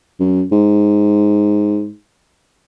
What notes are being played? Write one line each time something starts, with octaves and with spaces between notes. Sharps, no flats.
F#2
G#2